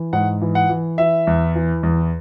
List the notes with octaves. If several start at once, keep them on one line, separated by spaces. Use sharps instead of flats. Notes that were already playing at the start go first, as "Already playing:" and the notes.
Already playing: E3
G#2 F#5
E3
F#5
E3
E3 E5
E2
E3
E2